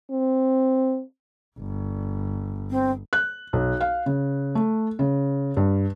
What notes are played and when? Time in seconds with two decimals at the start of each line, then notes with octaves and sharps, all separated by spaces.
0.10 C4
1.58 G1
2.71 C4
3.13 F#6
3.53 B1
3.81 F5
4.06 C#3
4.55 A3
4.99 C#3
5.57 G2